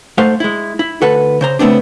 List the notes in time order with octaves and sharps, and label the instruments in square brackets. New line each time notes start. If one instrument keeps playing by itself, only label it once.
[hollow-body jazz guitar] G#2 A3 C5 F5 F#5
G#3 E4
E4
D2 A4 B4 F#5
C#3 C5 A#5
C#3 A3 B3 C4 D4